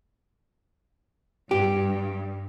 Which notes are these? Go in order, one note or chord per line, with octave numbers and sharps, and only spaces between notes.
G2 G4